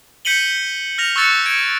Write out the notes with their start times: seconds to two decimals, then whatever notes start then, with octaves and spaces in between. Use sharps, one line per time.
0.25 G6 B6 C#7 D#7 F#7 G7
0.98 F6 A#6 F7
1.16 C#6 E6 F#6 A6 C#7
1.46 G#6 C#7 D7